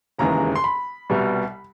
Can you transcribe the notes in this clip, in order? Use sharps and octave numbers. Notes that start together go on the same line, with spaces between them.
E1 D#2 C#3 E3 G#3 A#5
C6
B5
C2 B2 G3